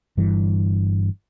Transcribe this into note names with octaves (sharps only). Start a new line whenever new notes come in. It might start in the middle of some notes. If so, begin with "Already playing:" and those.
G1 G2 E3